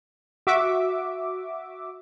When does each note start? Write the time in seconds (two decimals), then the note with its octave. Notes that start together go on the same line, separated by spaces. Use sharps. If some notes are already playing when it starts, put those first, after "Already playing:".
0.47 F#4 E5 D6